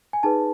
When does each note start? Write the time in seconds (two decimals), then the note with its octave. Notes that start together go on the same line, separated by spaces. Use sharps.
0.13 G#5
0.23 D#4 G#4 B4 A5